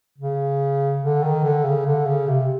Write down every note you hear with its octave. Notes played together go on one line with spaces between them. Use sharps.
C#3
D3
D#3
D3
C#3
D3
C#3
C3